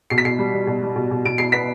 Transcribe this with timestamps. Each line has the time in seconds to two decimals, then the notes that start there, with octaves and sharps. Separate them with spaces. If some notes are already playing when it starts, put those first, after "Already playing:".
0.10 B2 C7
0.18 B6
0.25 B2 C7
0.39 G3
0.54 G3
0.67 B2
0.82 G3
0.96 B2
1.11 B2
1.25 B2 D7
1.38 B2 C7
1.52 B3 B6